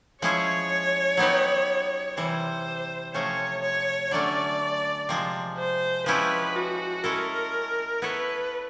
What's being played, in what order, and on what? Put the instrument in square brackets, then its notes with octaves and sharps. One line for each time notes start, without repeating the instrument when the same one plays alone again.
[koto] F3 G#3 C#4 E4 G#4 [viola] C#5
[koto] F#3 B3 D#4 G4 B4
[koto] C3 E3 G3 [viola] C5
[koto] C3 F3 A3 C#4 [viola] C#5
[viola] C#5
[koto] D3 F#3 A3 C#4 [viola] D5
[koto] C3 F3 G#3
[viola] C5
[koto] F3 G#3 C#4 E4 G4 [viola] B4
[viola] F#4
[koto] G#3 C#4 E4 A4 [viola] A#4
[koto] B3 E4 A4 C#5 [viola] B4